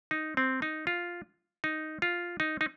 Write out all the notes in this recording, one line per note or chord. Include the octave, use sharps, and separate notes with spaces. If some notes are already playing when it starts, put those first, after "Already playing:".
D#4
C4
D#4
F4
D#4
F4
D#4
D#4